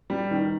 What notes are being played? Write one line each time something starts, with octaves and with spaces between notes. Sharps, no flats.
G3
D#3